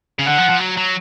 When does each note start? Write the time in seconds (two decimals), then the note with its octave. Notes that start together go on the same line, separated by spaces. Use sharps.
0.19 C#3
0.26 D3 F#5
0.38 F3
0.50 F3
0.60 F#3
0.77 F#3